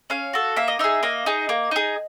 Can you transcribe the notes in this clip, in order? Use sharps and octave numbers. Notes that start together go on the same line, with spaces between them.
C#4 F5
F#4 A4
A#3 E5
D#5
D#4 G#4 E5
A#3 D#5
D#4 G#4
A#3
D#4 G#4